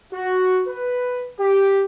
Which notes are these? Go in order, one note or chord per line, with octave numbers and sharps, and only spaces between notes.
F#4
B4
G4